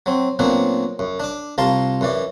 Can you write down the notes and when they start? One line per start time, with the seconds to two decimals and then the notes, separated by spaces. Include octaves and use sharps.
0.06 F#3 C4
0.39 A#2 F#3 B3 C4 D4
0.99 F#2
1.20 D4 D6
1.58 C2 F4 A5 A#5 C6
2.01 F#2 E3 D5